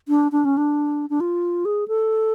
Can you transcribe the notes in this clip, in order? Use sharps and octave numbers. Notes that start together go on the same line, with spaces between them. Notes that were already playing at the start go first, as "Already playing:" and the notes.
D4
D4
C#4
D4
D4
F4
G#4
A4